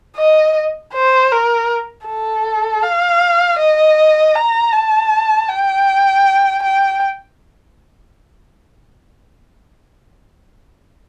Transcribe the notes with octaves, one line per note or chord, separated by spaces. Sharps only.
D#5
C5
A#4
A4
F5
D#5
A#5
A5
G5
G5